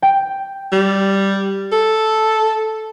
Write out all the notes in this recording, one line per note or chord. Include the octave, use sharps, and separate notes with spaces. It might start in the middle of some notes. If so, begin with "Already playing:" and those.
G5
G3
A4